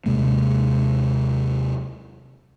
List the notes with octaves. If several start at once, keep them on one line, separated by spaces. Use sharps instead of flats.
D#2 C3 G#3 A#3